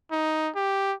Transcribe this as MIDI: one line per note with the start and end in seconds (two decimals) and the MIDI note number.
0.12 0.50 63
0.55 0.94 67